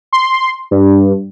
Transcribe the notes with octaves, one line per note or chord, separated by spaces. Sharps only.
C6
G2